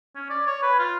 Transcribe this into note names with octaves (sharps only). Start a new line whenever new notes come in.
C#4
D5
C#5
B4
F4